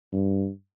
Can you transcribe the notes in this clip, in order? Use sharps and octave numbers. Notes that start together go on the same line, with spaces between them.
G2